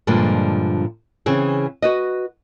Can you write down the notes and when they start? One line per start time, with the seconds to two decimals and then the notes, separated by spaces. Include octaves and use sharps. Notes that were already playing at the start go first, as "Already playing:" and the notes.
0.07 G2 A#2 D3 F3 G#3
1.26 C#3 E3 C4 G#4
1.82 F#4 B4 D#5